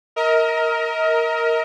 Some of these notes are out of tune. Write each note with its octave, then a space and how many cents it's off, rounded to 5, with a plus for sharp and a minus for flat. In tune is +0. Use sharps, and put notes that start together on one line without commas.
A#4 +0 D#5 +40